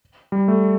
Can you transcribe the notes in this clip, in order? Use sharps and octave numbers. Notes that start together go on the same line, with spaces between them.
G3
A3